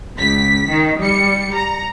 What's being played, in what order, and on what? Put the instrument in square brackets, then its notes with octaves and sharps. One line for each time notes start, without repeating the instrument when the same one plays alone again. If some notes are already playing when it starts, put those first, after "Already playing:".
[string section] C#2 B6
D#3
G3 C#7
A#5